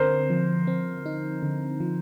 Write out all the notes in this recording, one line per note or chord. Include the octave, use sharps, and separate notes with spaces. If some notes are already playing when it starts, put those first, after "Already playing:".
Already playing: D3 C4 A#4 C5
F3
C4
D#4
D3
F3